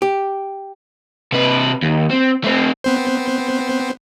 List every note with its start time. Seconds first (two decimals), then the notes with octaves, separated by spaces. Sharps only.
0.02 G4
1.32 C3 B4
1.82 D#2
2.10 C4
2.44 A3 C4
2.84 B3 C4 C5